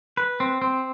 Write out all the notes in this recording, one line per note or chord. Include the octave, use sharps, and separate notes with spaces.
B4
C4
C4